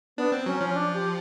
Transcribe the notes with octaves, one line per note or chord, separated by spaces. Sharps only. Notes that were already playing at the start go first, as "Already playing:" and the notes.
B3 D4
C4
F#3 C#4
F3 C#4
D4
G4